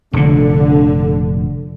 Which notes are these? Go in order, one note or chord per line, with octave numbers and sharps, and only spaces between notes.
F1 A#2 D3